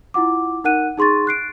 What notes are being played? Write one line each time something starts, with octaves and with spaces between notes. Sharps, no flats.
E4 F4 F#5 D6
D#4 A#4 F#5 F#6 D#7
D#4 G#4 C6 C#6 A6
F#6 C7 D7